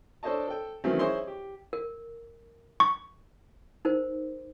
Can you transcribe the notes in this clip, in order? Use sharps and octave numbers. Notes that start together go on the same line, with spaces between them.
D4 A4 C5 C#5 D#5 A5
A4 G5
D#3 E3 F#3 A3 C4 C#4
E4 G#4 C5 C#5 D#5 C6
G4
A#4
C#6
D#4 A#4 C5